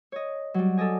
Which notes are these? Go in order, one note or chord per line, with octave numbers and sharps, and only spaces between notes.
C#5 D#5
F#3 G3
A4 D5 D#5 G#5